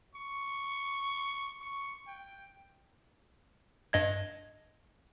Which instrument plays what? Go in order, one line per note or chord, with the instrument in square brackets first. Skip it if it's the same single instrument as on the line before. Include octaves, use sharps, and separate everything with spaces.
[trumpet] C#6
C#6
G5
[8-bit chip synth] G2 D#5 G#6